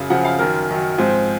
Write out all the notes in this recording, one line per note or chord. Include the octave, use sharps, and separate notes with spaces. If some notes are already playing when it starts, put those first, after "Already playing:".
Already playing: F#2 C#3 F5
F#2 C#3 F3 F#5
F5
F#2 D#3 F#3 A#4
F#2 D#3 F#3
G#2 F3 C4